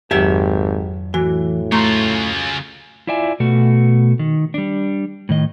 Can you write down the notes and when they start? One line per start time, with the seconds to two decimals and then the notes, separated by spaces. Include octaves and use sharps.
0.11 G#1 F2 F#3 G4 E5
1.14 A2 E3 F#4
1.72 C#3 A3 F4 A#5 C6
3.07 E4 F4 D5 E5 G#5
3.40 B2 A3 F#4
4.19 D#3
4.54 G3 D4
5.29 A2 D#3 D#5